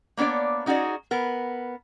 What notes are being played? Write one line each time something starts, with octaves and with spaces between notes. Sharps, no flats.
A#3 B3 D4 C#5 D5
C#4 D#4 F#4 G#4 D5
B3 A#4